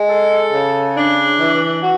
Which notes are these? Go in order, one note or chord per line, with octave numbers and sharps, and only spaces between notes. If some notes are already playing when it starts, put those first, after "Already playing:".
Already playing: G#3
A4
C#3
D4
E3
F#4